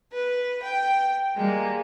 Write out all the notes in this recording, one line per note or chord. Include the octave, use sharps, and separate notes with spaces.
B4
G5
G3 G#3 A#3